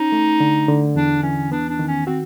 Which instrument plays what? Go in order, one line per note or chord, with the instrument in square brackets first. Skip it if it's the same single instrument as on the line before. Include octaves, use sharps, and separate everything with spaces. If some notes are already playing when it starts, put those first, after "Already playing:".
Already playing: [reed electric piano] C#4 [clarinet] D#4
[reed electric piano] A3
D3
D3
[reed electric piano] E2 [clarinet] D4
[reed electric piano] E3 [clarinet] C#4
[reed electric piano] B3 [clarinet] D4
[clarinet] D4
[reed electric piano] D#3
[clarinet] C#4
[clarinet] C4 [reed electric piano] F#4